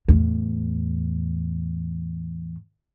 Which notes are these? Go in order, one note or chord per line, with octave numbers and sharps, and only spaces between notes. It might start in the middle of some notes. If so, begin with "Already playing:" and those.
E2 A2